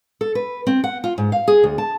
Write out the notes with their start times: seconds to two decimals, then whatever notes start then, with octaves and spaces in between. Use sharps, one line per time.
0.21 A4
0.35 B4
0.67 C4
0.84 F#5
1.04 F4
1.18 G#2
1.32 F5
1.48 G#4
1.64 D2
1.78 A5